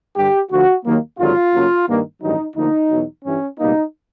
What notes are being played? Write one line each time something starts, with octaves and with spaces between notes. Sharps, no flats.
G2 D3 G3 G4
D2 D3 F3 F#4
D#2 D#3 F#3 A#3
G#1 G2 D3 F#3 F4
F#2 C#3 F#3 A#3
G2 D#3 G3 A#3
A1 G2 D#3 F#3 D#4
D2 D3 F3 A#3 D#4
E2 B2 F#3
G2 E3 G3 C#4
C#2 B2 G3 A#3 D#4